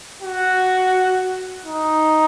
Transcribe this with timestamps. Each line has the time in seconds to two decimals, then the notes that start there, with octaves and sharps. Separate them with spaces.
0.22 F#4
1.66 D#4